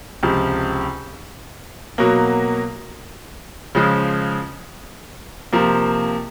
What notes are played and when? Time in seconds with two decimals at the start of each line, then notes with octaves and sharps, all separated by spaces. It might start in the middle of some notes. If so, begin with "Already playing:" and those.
0.23 C#2 C3 F3
1.98 B2 F#3 A#3
3.75 C#3 F3 G#3
5.53 C3 F3 A#3